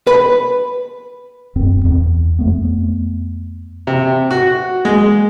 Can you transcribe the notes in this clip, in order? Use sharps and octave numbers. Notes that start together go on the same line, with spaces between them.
B4
D1 F#2 C4
E2
F2 A3 B3
C3
F#4
G#3